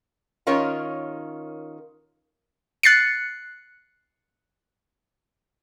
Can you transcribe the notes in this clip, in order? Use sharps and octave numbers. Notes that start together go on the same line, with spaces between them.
D#3 C#4 F4 A#4 C#5
F#6 A6 C7 C#7